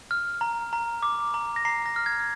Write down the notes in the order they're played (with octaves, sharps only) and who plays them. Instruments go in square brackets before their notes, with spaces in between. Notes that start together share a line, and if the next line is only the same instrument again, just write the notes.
[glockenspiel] F6
A#5
A#5
D6
A#5
A#6
A#5 C7
A#6
F6
G#6